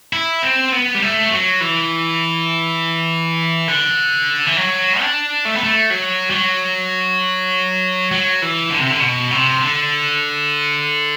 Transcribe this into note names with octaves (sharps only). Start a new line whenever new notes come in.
E4
C4
B3
G3
A3
F#3
E3
D3
E3
F#3
D4
A3
B3
A3
F#3
G3
F#3
F#3
E3
D3
C3
D3
B2
C3
D3